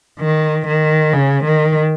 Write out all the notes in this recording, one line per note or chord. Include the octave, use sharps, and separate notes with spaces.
D#3
D#3
C#3
D#3